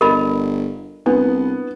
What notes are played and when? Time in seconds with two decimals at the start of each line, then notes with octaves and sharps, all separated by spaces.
0.01 G1 A#4 D#5 B5
1.06 C2 B3 D4